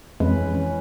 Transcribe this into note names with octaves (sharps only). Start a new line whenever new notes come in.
F2 E3 G#3 C#4 B4
E3 C#4